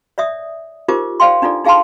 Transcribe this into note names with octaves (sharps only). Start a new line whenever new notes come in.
C#5 D5 E5 D#6
D#4 F4 G4 A#4 C5 D6
C5 D5 F5 G5 C6
D4 D#4 F4 A4 D5
D#4 G#4 F5 G5 A5 C6